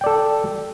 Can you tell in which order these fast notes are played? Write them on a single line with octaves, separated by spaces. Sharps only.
G5 D5 A4